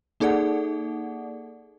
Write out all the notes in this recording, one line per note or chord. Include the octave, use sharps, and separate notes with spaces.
A#3 D#4 G#4 A4 D5 F#5